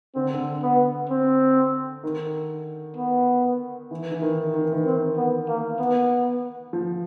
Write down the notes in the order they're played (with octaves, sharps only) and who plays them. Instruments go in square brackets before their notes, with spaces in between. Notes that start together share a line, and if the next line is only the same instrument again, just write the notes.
[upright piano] D3 [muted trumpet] C4
[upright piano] D3
[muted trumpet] B3
C4
[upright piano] D#3
[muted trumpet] B3
[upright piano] E3
E3
D#3
D#3
E3
D#3
[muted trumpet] C4
B3
A#3
B3
[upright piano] F3